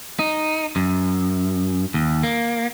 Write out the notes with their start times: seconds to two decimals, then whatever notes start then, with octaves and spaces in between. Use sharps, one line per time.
0.19 D#4
0.76 F#2
1.94 D#2
2.23 A#3